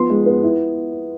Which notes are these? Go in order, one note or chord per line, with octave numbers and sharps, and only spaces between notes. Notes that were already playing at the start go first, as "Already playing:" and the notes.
Already playing: F3 B3 C6
G#3
B3
E4